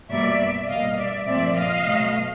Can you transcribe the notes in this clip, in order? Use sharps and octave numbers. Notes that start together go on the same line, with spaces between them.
B2 G3 A#3 D5 E5
B2 G3 A#3 D#5 F5
D5 E5
A#2 F3 A3 C4 D5 E5
D#5 F5
B2 F#3 A3